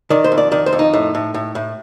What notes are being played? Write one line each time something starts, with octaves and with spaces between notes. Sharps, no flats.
D#3 D5
C5
F2
D5
D#3 D5
C5
F2
D#4
A2
A2
A2
A2